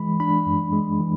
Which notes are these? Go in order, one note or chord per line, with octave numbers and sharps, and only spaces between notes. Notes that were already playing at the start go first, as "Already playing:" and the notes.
Already playing: E3 G#3 B5
D4 B5
F#2
G#3
E3